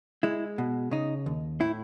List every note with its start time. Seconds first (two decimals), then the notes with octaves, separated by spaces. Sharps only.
0.23 G#3 E4
0.58 B2
0.91 C#3 D#4
1.26 D#2
1.61 A2 E4